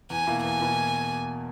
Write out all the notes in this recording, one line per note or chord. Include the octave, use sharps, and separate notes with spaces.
E2 G#5
B2 A#3 E4
E2 G#5
B2 A#3 E4